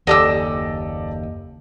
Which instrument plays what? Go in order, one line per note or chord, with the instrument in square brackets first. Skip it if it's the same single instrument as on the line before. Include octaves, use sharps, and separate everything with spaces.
[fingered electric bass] F#1 D#2 [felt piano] G4 A4 D5 [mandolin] D#5 D6 E6